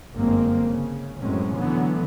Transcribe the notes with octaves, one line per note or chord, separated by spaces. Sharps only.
G1 F#2 G#3 A#3 C4
C#3
F#2 A2 F#3 G#3 C4 C#4
A2 D3 E3 F#3 B3